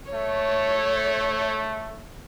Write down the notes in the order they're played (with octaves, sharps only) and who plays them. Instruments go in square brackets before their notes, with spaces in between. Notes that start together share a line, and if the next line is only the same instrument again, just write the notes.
[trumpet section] A3 [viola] C#5